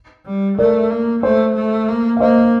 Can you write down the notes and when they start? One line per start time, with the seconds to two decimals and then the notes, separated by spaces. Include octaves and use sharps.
0.26 G3
0.58 A3 A#4 D5
0.90 A#3
1.23 A3 C5
1.56 A3
1.88 A#3
2.17 F5
2.20 A#3 C5 D#5